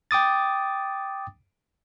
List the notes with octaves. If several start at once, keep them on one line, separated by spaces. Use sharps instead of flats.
G5 D6 D#6 A6